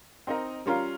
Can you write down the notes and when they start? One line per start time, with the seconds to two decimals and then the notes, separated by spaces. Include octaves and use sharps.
0.27 C4 D#4 A#4 D#5
0.66 G3 C#4 F4 A#4 F5